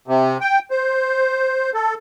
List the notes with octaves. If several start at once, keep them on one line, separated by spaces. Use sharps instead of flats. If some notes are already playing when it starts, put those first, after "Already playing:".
C3
G5
C5
A4